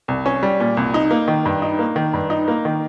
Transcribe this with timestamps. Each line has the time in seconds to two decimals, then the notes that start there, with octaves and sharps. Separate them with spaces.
0.08 C2
0.26 C#4
0.43 G3
0.60 A#2
0.77 C2
0.94 D#4
1.11 A#3
1.28 D#3
1.45 G2
1.62 D#4
1.79 A#3
1.96 D#3
2.13 G2
2.30 D#4
2.48 A#3
2.65 D#3